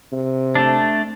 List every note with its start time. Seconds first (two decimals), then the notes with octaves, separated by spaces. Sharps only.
0.12 C3
0.55 A3 D4